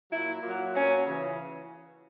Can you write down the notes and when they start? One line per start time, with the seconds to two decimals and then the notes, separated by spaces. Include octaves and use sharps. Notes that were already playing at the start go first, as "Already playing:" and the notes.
0.11 A#2 F#3 E4
0.42 A#2 F#3
0.75 A#2 F#3 C#4
1.06 C#3 E3